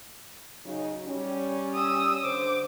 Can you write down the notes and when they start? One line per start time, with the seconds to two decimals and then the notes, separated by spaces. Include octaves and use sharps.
0.66 C#3 F#3 D#4
1.07 G3 C#4
1.75 D#6 E6
2.24 D3 C5 D6